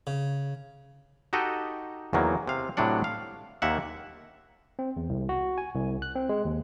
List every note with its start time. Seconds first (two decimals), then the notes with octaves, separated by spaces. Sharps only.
0.07 C#3
1.33 D#4 F#4 G4 A4 D#5
2.13 E2 D#3 F#3 A#3
2.48 C3 F5
2.77 A2 C3 F#3 D4 F#5
3.04 F5
3.62 D#2 A#3 E5 F#5
4.79 C4
4.96 E2
5.09 C2
5.29 F#4
5.58 G#5
5.75 C2
6.02 F#6
6.15 C4
6.29 G#3
6.45 D#2